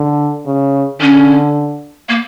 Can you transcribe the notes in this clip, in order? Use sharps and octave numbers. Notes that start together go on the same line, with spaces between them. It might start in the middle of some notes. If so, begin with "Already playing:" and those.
Already playing: D3
C#3
D3 C#4
A#3